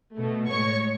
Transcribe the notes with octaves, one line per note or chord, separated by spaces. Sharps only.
B2 A3
A2 G#3 C#5 C#6